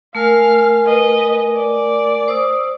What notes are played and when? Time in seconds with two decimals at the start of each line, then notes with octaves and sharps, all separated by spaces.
0.15 A3 A#4 F5 G#5 F6
0.86 B4 D#5
1.55 D5
2.28 C5 D#6 E6